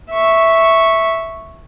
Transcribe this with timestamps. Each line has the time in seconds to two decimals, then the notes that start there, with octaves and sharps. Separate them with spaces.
0.11 E5 C#6